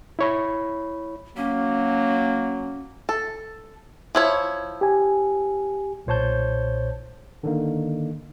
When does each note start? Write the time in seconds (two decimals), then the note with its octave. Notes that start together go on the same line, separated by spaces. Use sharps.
0.19 E4 C#5 B5
1.37 F#3 A#3 C#4
3.09 A4
4.15 F3 E4 C#5
4.81 G4 G#5
6.06 B1 A#2 C5 C#5 A5 G6
7.43 D3 D#3 A#3